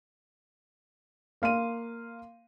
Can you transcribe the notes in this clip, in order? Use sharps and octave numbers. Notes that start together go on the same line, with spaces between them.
A#3 F5 C6 D#7